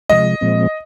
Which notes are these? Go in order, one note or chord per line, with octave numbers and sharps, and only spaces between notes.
C3 F3 G#3 D#5
A#2 F3 G#3 C4